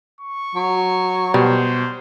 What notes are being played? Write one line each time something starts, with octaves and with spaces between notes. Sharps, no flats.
C#6
F#3
B2 G3 C5